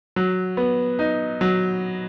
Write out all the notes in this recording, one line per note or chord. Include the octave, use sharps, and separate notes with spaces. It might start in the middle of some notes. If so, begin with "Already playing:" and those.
F#3
B3
D#4
F#3